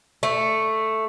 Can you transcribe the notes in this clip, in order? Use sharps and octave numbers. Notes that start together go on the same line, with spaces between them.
A3